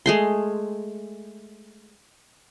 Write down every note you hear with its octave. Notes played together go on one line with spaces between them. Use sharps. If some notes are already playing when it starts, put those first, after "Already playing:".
G#3 A3 C6